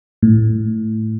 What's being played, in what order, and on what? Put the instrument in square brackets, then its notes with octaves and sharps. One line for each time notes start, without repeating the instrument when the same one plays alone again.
[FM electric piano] A2